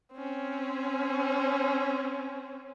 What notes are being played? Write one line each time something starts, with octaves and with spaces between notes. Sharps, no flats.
C4 C#4